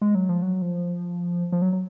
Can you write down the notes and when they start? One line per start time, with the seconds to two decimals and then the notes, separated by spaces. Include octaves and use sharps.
0.01 G#3
0.15 F#3
0.29 F3
0.42 F#3
0.62 F3
1.52 F3
1.62 F#3
1.73 F#3